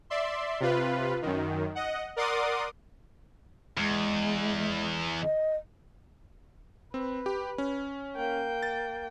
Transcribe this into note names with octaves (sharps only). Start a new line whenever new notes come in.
D5 E5 C6
C3 F4 B4
F#2 D#3
D#5 F#5
A#4 D5 F#5 C6 D6 D#6
E2 G#3
D#5
C4 B4
G4
C#4
A#3 G5
A6